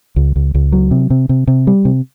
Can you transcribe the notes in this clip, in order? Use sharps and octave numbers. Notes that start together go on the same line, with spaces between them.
C#2
C#2
C#2
F#3
C3
C3
C3
C3
G3
C3